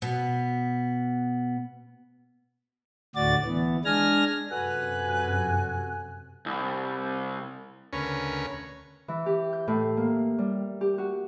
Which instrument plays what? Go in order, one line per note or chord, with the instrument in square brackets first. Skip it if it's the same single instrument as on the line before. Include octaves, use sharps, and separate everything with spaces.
[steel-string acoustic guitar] B2 B3
[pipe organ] D2 A2 F#4 D5 A6
E3 B3
G#3 D4 G#5 F6 A#6
[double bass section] F#2 C3 [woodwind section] F#4 A4 G#5 [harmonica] B4 [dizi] F#6
[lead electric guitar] C2
[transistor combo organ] D2 C#3 C#4 A#4 B4 C#6
[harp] E3
G4
G6
A2
A#3
G3
G4
F#4